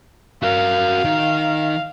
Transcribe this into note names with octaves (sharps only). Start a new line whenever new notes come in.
F#4 A#4 F5
D#3